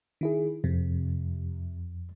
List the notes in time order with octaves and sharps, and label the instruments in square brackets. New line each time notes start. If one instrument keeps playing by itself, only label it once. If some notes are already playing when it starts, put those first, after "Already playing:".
[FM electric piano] D#3 E4 G#4
[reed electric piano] F2 [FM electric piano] C3